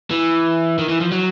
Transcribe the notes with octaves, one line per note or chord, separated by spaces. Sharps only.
E3
D#3
E3
F3
F#3